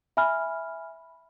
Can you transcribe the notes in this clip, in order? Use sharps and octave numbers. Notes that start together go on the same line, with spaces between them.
E5 G#5 B5 F6